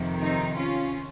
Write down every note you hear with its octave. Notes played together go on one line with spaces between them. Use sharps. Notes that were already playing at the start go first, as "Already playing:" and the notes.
Already playing: F2 C3 D#3
C4 D#4
C#4 F4